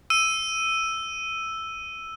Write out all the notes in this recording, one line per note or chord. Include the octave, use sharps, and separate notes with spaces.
E6 D#7